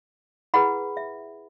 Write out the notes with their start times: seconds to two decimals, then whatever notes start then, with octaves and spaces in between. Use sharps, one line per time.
0.54 E4 G#4 B4 F#5 B5
0.97 E5